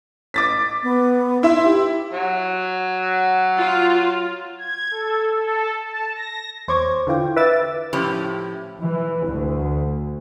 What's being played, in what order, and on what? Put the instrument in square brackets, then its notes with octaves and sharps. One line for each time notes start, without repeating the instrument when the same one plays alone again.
[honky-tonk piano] D6 A6 B6
[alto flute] B3
[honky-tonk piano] E4 E5 [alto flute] C6
[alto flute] G4
[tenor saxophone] F#3
[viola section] F4
[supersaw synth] G#6
A4
A4
A5
A#6
[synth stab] E2 C5 C#5 C#6 D6 G#6
D3 E3 F4 G5
B4 E5 D6 E6 A6
[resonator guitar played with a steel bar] A2 F3 C#4 E4 G4
[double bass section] E3
D2